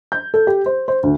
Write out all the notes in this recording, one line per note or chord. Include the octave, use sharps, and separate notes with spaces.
G6
A4
G4
C5
C5
D2